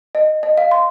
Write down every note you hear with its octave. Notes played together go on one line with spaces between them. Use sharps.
D#5
D#5
F5
C6